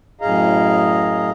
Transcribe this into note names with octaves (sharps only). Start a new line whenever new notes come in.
F#2 A2 G#4 D#5 F5 A#5